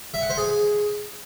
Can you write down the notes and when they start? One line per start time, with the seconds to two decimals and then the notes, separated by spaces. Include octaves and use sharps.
0.14 E5
0.22 F#5
0.30 C5
0.37 G#4